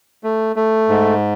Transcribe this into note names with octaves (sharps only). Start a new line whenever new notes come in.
A3
A3
G#2